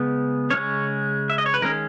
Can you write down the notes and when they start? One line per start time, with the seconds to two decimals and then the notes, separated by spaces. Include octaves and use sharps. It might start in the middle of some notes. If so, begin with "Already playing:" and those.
Already playing: C#3 G#3 B3
0.50 C#3 G#3 C#4 C#5
1.30 E5
1.38 D#5
1.46 C#5
1.54 B4
1.62 D#3 G#3 C#4 A#4